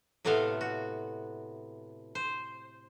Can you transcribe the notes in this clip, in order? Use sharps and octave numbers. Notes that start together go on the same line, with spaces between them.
A2 C3 A3 B3 A4 F5
F#4
C5